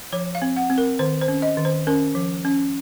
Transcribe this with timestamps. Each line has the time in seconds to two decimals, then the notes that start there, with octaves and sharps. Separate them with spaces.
0.13 F3 C#5
0.35 F5
0.42 C4
0.57 F#5
0.70 C4
0.78 A#4
0.99 D#3 C5
1.21 C5
1.28 C#4
1.42 D#5
1.57 D#3
1.65 C5
1.87 C#4 A#4
2.15 F3
2.45 C#4